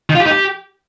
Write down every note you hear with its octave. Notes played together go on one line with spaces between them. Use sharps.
D#3
F4
G4
D#4
G4